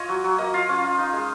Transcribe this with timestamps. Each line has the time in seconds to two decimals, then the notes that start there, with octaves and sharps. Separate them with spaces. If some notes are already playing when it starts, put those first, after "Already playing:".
Already playing: F4 C#5 D#5
0.09 F#3
0.24 F#3
0.38 A#3 D#5
0.54 F4 F5
0.69 C#4 F5
0.84 F4
0.98 D#4
1.13 G#3